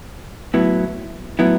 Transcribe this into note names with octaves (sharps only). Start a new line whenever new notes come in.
A2 F#3 B3 E4
A2 F#3 B3 E4